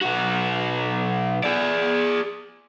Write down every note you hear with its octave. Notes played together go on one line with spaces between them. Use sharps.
B1 F#4
G#4 D5